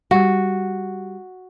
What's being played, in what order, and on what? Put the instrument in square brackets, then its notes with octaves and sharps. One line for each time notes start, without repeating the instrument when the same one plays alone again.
[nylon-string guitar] G3 [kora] F#4